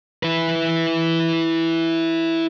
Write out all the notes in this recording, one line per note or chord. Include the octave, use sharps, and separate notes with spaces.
E4 B4